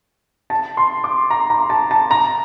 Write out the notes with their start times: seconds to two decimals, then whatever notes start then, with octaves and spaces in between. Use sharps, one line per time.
0.50 A5
0.77 C6
1.04 D6
1.30 A#5
1.50 A#5
1.70 A5
1.91 A5
2.11 A#5